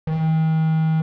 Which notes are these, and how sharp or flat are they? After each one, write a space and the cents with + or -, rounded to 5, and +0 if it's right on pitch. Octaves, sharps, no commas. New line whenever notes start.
D#3 +40